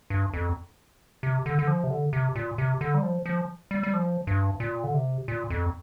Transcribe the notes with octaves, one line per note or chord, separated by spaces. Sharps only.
G2
F2
C3
D3
D3
F3
C3
D3
C3
A#2
C3
D3
G3
F3
F3
G3
G3
F3
G2
A#2
D3
C3
A#2
F2